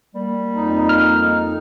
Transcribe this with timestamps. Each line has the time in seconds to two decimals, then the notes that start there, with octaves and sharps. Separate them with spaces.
0.15 G3 A#3
0.55 F2 D#4
0.89 F6